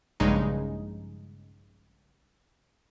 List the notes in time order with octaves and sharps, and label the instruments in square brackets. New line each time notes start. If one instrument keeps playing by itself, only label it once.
[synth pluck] A#1 G2 C#3 G#3 D#4